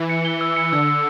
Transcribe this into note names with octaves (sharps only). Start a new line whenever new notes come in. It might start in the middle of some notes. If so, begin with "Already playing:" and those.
Already playing: E3
C#7
G7
E6
C#7
D3 E6
E6